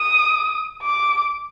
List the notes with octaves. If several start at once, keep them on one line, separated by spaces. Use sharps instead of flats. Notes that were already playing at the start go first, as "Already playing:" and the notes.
Already playing: D#6
D6